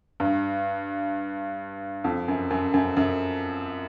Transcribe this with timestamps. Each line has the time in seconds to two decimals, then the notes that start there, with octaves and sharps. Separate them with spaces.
0.20 G2
2.04 F2
2.28 F#2
2.50 F#2
2.74 F#2
2.97 F#2